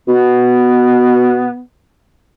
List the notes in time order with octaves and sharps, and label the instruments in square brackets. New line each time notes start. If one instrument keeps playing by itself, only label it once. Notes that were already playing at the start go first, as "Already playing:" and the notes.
[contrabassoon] B2 [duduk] B3